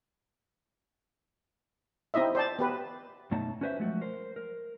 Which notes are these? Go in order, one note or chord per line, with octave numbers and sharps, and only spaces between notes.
C4 D#4 E4 D#5 E5
C5 D5 A5
B3 G4 B4
F#2 B2 A3 D#4 A5 A#5
C#4 F#4 B4 C5 D#5 E5
F3 F#3 G#3 A3 F#4
A#4 C5
A#4